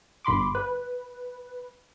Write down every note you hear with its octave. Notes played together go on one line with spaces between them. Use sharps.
G1 B5 C6 D6
B4